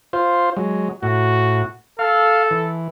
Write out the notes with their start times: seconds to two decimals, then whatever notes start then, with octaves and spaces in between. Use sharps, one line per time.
0.13 F4 C5
0.57 F#3 G#3
1.03 A2 F#4
1.99 A4 F5
2.51 E3